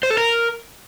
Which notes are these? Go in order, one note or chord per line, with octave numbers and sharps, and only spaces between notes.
C5
A4
A#4